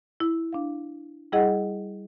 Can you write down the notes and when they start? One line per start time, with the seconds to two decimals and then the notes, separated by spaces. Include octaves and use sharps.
0.20 E4
0.53 D4 F5
1.32 G3 E4 G#4 D#5 F#5